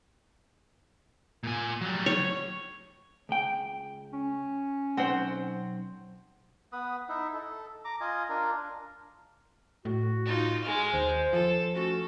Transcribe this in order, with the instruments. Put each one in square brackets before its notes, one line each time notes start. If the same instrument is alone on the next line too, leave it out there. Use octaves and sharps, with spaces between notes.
[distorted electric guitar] A#2 G#5
F#3 G3
[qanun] C#5
[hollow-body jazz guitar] C#2 G5
[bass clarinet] C#4
[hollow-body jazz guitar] B1 C5 [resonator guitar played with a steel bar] C4 F#5
[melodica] B3 B4 D#6
D#4 E4
A4
A#5 D6
F4 D#5 G#5
D4 F4 A#4
[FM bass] A2 [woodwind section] F#4
[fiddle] D#4 F4
G#3 F6
[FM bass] D#2 [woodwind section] C5
[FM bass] F3 [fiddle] A4
[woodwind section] A3 C#4 F#4 [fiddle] A4